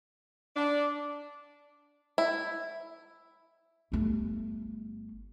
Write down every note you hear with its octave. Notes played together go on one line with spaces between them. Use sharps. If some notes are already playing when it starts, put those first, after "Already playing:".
D4
E4
G1 A3